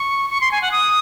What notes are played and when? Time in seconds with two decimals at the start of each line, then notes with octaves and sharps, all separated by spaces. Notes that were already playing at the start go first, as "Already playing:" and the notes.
Already playing: C#6
0.30 C#6
0.41 C6
0.52 G#5
0.62 F#5
0.72 D#6